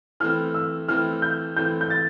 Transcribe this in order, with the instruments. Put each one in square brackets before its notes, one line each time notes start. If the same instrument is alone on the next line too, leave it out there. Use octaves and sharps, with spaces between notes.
[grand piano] E3 A3 C4 [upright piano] F6
[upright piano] E6
[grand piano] E3 A3 C4 [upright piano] F6
[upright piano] G6
[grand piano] E3 A3 C4 [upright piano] G6
[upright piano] G6
A6